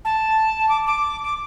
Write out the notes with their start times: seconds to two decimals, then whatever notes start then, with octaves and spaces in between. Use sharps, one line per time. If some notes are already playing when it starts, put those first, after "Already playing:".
0.05 A5
0.69 D6
0.86 D6
1.24 D6